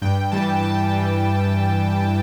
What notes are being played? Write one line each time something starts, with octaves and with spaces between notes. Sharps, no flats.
G2 G5
E3 G3 A5
G2 A5
E3 G3